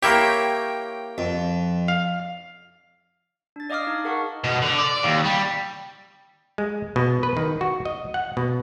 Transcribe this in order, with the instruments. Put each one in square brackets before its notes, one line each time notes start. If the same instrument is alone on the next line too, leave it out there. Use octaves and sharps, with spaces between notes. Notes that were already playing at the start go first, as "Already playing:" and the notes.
[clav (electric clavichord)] A#3 E4 G4 [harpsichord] C#5 G5
[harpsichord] F2
[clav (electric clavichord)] F5
[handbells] D4 A6
D5 D#5 F5 D6 D#6 F6
D#4
G#4 A#4 F5 F#5 A5 C#6
[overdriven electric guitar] B2
D3
D5
D#2
G3
[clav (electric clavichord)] G#3
B2
B4
D#3
F#4
D#5
F#5
B2